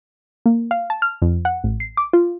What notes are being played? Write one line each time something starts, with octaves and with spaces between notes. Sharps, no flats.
A#3
F5
A5
F6
F2
F#5
A1
C7
D6
F4